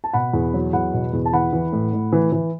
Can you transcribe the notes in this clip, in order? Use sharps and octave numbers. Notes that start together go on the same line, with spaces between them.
A5
B2 F#5 B5
E2
F#3
E2 F#5 B5
B2
E2
A5
E3 F#5 B5
E3
A2
A2
E3
E3